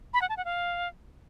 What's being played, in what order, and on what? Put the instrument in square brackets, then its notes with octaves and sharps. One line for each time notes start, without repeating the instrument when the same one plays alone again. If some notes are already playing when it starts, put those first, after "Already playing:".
[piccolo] B5
F#5
A5
F#5
F5